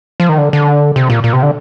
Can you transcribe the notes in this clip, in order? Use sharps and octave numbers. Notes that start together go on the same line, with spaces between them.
F3
D#3
D3
D3
C3
A#2
A#2
C3
D3